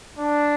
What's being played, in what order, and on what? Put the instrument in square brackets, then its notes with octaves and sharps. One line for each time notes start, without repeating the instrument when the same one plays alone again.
[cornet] D4